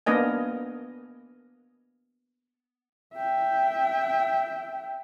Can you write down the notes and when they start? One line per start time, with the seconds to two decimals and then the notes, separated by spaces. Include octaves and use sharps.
0.06 A#3 B3 D4 A#4 D#5 G#5
3.15 E5 G5